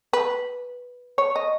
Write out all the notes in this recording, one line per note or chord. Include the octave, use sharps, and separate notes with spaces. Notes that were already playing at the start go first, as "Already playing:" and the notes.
B4
C#5
D#5